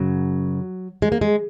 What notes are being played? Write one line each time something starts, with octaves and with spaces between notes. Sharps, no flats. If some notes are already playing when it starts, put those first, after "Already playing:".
Already playing: F#2 C#3 F#3
G#3
A#3
G#3